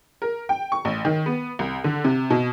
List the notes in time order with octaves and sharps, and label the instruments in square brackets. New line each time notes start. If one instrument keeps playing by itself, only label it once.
[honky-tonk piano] A#4
G5
C#6
A1
D#3
B3
C2
D3
C3
B2